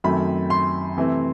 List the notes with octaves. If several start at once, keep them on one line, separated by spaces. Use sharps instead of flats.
F#2 D#3 A3 C4 B5
C6
C3 E3 A3 C4